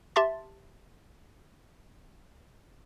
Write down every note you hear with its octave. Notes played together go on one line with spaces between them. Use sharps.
G4 E5 A5 C6 A6